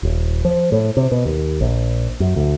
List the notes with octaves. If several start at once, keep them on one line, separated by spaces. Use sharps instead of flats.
D#1
F3
A2
C3
B2
D#2
A#1
F#2
D2